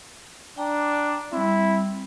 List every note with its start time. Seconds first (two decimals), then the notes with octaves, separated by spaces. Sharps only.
0.57 D4 G5 A#5
1.32 G3 C4 E4